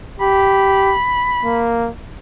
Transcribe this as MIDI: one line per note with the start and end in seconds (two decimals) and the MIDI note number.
0.20 0.95 67
0.20 1.65 83
1.44 1.90 58